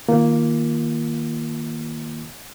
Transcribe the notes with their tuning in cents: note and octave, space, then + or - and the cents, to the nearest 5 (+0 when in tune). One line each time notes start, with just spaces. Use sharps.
D#3 +0 A#3 +0 F4 -20